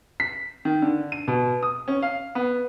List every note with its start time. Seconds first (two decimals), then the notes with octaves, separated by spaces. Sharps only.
0.20 B6
0.65 D#3
0.82 D3
1.12 D#7
1.28 B2
1.63 D#6
1.88 C#4
2.02 F5
2.35 B3